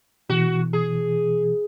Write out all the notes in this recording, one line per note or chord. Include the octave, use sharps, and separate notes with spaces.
B2 E3 F#4
G#4